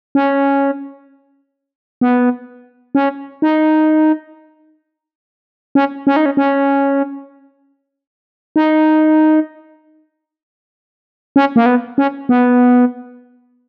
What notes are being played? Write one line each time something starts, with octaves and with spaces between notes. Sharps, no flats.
C#4
B3
C#4
D#4
C#4
C#4
D#4
C#4
C#4
D#4
C#4
A#3
B3
C#4
B3